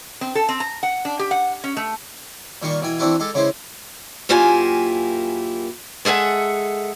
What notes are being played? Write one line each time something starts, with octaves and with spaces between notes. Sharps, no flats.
C4
A4
C4
A#5
F#5
D4
G4
F#5
C#4
A3
A#2 D#3 G3 F5 C#6
B2 E3 G5 G#5
E3 C4 D4 E4 F#4 G4
G#3 G4 A4
C#3 G#3 E4 G4 C5
F#2 A#3 E4 F4 G4 G#5
G#3 G#4 A4 E5 F#5